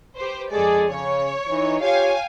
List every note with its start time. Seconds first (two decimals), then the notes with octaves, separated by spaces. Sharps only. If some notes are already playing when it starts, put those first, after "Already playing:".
0.16 G4 B4 C5
0.52 F2 G#3 G#4 A4 D5
0.90 C#3 C#5
1.49 E3 D#4
1.81 F4 G4 C#5 F5 G5 G#5